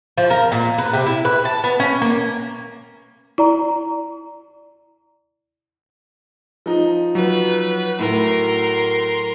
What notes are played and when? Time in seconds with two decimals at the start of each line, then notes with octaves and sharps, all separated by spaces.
0.18 F3
0.30 A#4
0.52 A#2
0.78 B4
0.93 C3
1.06 E4
1.25 B4
1.45 A5
1.64 B3
1.80 C#4
2.02 A#3
3.38 E4 D5 A#5
6.66 F3 D#4
7.15 F#3 B4
7.99 A2 A#4 C6